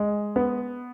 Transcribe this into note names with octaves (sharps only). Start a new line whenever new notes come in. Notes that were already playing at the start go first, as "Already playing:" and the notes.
Already playing: G#3
B3